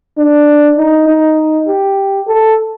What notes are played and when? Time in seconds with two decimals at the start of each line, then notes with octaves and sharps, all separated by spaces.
0.18 D4
0.78 D#4
1.08 D#4
1.68 G4
2.28 A4